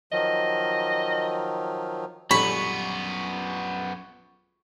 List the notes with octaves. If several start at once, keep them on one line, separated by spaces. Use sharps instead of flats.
D#3 F3 F#3 D#5
A#1 F#2 G3 B3 A4 B5 C#6